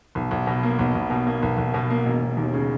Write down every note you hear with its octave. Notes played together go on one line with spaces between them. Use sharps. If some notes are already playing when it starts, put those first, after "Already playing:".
B1
B1
B2
A#3
B1
B1
B2
A#3
B1
B1
B2
A#3
E1
E1
D#2
C#3